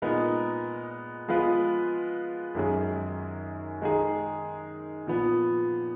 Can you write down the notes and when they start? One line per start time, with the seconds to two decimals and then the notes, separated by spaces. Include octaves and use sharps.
0.02 A#2 G#3 B3 D#4 A#4
1.28 F3 G#3 B3 F4 B4
2.55 F#2 D#3 G#3 C#4 G#4
3.81 D#3 G#3 D#4 G#4
5.07 A#2 F3 B3